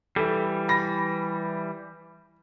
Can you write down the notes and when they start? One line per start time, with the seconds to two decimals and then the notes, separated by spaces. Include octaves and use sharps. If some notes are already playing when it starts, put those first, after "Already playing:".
0.16 E3 G3 A4
0.69 B5 A#6